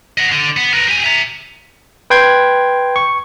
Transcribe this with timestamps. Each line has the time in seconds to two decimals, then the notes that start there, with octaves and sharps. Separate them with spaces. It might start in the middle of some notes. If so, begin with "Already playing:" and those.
0.18 D#5 F#5
0.32 D3
0.57 B3
0.74 A#4 B4
0.88 G4 G#5
1.04 E5 A#5
2.10 B4 G5 C6 G#6
2.96 C#6